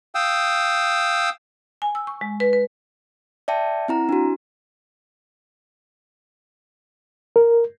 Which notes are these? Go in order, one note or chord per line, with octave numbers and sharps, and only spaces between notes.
F5 G5 D#6 E6
G#5
E6
C#6
G#3
B4
B4
D5 E5 G5 A5
C4 E4 A#5
D4 F#4
A#4